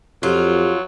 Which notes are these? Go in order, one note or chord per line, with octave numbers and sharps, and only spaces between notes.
F2 F#3 F4 G4